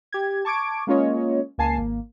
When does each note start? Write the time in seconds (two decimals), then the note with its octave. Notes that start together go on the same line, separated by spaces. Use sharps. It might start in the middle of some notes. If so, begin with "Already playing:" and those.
0.12 G4 G#6
0.45 A5 C#6 D6 G#6 D7
0.87 G#3 A#3 C#4 F4 C#5 D#5
1.58 C#2 A#3 G#5 A5 C7
1.78 G#1 A#3